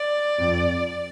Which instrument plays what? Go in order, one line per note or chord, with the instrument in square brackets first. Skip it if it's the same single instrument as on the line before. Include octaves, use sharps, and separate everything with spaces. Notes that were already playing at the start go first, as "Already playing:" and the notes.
Already playing: [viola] D5
[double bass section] F2